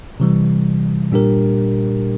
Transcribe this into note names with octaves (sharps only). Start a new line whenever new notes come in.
C3 E3 G3
A#2 G3 D4 G4 A#4